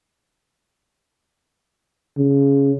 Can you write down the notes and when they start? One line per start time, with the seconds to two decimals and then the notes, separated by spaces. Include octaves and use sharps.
2.18 C#3